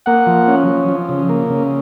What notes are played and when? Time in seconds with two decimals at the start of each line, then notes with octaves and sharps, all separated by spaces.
0.06 A#3 F#5
0.27 F3
0.47 C#4
0.67 F3
0.88 F3
1.09 C#3
1.29 A#3
1.50 C#3